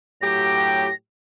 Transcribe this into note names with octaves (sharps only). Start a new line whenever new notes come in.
A2 F#3 G4 A#6